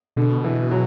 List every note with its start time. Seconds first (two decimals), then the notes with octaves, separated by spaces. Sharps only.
0.16 B2 D3
0.44 E3
0.71 F#3